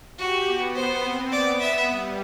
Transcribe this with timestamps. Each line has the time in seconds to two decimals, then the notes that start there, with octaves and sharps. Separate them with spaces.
0.18 F#4 G4
0.46 B3
0.75 B3 C5
1.03 C4
1.31 B3 D5
1.60 B3 E5
1.89 G3